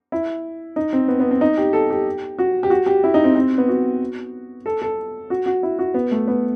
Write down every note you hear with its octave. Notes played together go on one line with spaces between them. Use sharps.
E4
D#4
C4
B3
B3
C4
D#4
G4
A4
G4
F#4
G4
F#4
G4
E4
D#4
C4
C4
B3
F#4
A4
A4
F#4
F#4
E4
F#4
B3
A3
B3